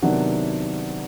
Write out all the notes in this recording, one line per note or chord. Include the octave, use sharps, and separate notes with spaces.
C3 D#3 F#3 B3 D4 F#5